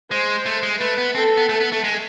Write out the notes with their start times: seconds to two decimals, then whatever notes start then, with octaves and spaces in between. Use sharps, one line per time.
0.11 G#3 C5
0.46 A3
0.63 G#3
0.79 A3 B4
0.98 B3
1.15 C4 A4
1.37 B3
1.49 A3
1.61 B3
1.72 A3
1.84 G#3